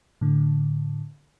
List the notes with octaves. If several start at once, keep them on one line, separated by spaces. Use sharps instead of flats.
A2 D3